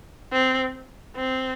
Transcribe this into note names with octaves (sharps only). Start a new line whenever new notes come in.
C4
C4